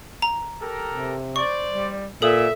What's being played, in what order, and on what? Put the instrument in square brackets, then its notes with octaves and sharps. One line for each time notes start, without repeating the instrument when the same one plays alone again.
[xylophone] A#5
[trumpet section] G4 A4 A#4
[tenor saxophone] C3
[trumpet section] C5 D5 [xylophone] C#6
[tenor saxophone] G3
[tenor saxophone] A#2 [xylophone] A4 D#6 [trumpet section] E5